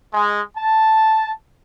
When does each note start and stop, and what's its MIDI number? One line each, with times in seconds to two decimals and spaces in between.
0.13 0.41 56
0.57 1.32 81